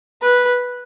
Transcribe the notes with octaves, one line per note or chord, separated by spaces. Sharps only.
B4